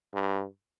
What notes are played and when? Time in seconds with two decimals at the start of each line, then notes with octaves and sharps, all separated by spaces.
0.14 G2